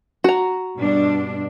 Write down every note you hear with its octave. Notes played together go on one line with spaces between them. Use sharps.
F#4 A#5
G2 B2 D4